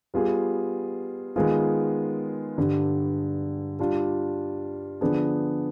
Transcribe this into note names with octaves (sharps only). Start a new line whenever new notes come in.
G3 B3 F4 G#4
D#3 G#3 B3 F4 G#4
G2 D3 G3
G3 D4 F4
D3 F3 B3 D4 G#4